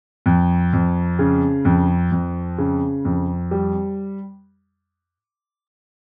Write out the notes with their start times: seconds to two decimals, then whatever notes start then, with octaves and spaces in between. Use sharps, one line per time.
0.26 F2
0.73 F2
1.19 C#3
1.65 F2
2.12 F2
2.58 C#3
3.05 F2
3.51 G3